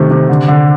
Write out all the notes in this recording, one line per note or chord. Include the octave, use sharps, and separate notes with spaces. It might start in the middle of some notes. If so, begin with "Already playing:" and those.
Already playing: C3 D#3 A3
C3
D3
D3